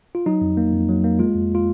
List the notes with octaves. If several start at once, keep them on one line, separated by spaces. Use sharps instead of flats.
F4
F#3 D#4
F2
A#3
F2
F#3
A#3
G#3 F4
F2
F4